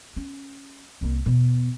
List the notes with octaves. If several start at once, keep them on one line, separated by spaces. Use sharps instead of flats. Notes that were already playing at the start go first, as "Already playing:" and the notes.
C#4
C2 A#3
E2 B2